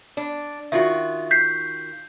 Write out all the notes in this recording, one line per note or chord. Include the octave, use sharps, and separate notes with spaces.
D4
D#3 F4 F#4 E5
G6 B6 C7